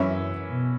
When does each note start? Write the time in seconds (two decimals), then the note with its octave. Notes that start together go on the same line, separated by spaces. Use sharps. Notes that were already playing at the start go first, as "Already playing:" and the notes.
Already playing: F#2 E3 C#4 E4
0.48 B2